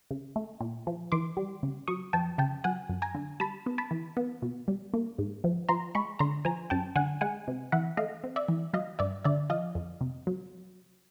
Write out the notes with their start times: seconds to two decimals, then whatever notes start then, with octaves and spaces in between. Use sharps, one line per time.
0.11 C#3
0.36 A3
0.61 A#2
0.87 F3
1.12 E3 C6 D6
1.37 G3
1.63 C#3
1.88 F#3 C#6 D#6
2.13 F2 G5 A5
2.38 C#3 G5 A5
2.64 F#3 F#5 G#5
2.89 F#2
3.02 G#5 A#5
3.15 D3
3.40 G3 A5 B5
3.66 B3
3.78 A5 B5
3.91 E3
4.17 B3
4.42 B2
4.68 G3
4.94 A#3
5.18 G#2
5.44 F3
5.69 F3 A#5 C6
5.95 G#3 B5 C#6
6.19 D3 A#5 C6
6.45 F3 G#5 A#5
6.70 F#2 G5 A5
6.96 D3 F#5 G#5
7.21 G#3 F#5 G#5
7.48 C3
7.72 E3 E5 F#5
7.97 A3 D#5 F5
8.24 C4
8.36 D5 E5
8.48 E3
8.73 F#3 D#5 F5
8.99 G2 D5 E5
9.24 D3 D5 E5
9.50 F3 D#5 F5
9.75 F2
10.01 C3
10.27 F#3